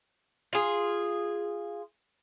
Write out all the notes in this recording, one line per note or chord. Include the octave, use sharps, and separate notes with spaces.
F4 G#4